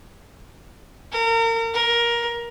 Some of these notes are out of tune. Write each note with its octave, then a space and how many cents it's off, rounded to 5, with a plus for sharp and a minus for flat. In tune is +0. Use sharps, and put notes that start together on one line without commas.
A#4 -35
A#4 +15